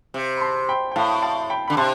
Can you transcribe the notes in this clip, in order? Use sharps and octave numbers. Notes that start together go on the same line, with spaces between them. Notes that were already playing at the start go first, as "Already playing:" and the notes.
C3
B5
A5 C6
G5 B5
G5
A2 F5 A5
F5 A5
G5 B5
D3 B5
C3 A5 C6